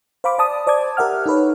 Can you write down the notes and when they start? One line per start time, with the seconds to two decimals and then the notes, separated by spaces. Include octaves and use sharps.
0.24 C5 F5 B5 D6
0.38 D5 A5 D#6
0.67 C5 D5 A5 D6 G#6
0.97 G4 A#4 E5 F#5 F6
1.26 D#4 A4 B4 C#5